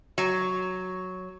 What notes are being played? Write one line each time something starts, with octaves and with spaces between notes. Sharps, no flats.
F#3